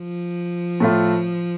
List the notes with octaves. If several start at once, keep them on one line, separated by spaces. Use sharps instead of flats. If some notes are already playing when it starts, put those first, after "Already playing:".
Already playing: F3
A2 A3 F4